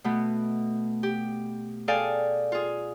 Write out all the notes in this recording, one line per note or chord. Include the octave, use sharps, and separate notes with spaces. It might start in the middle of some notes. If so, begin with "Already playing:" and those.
B2 A3 B3
G4
G#4 A4 D5 F5 G5 G#5
F4 G#4